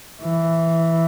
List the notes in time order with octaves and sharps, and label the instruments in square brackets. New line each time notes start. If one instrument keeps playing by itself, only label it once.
[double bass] E3